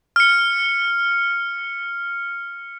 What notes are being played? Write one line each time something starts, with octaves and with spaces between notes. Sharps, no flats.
F6 C#7